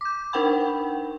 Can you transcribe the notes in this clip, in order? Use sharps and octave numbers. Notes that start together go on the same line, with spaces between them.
D6 G6
D4 D#4 A#4 F#5 G5 B5